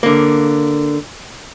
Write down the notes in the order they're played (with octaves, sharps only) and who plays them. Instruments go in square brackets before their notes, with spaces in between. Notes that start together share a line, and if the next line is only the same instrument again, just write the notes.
[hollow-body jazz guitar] D3 A#3